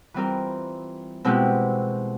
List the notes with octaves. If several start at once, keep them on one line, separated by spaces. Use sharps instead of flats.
E3 G3 C4 F4 A#4
B2 G#3 C4 E4 G4